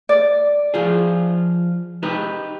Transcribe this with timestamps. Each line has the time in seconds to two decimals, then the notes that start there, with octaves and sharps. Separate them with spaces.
0.09 D5
0.74 F3 F4 G#4
2.03 D#4 G4 B4